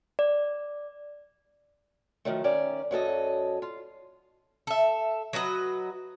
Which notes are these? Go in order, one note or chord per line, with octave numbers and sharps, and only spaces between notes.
D5
D#3 F3 F#3 A3
D#3 C#4 D5 E5
F#2 F#3 A4 D#5
F4
A4 E5
F#3 F#4 B4 D#5